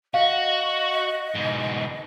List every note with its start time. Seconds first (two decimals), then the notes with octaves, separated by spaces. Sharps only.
0.14 F#4 D#5 F5
1.35 G#2 B2